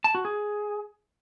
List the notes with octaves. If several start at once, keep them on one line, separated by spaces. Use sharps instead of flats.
A5
F#4
G#4